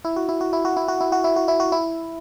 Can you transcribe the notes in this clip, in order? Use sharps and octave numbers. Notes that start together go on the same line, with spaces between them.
E4
F#4
E4
F#4
E4
F#4
E4
F#4
E4
F#4
E4
F#4
E4
F#4
E4